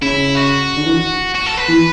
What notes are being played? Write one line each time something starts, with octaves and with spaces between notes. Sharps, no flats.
C#3 E4
F#4
D3
E3
F#4
A4
B4
E3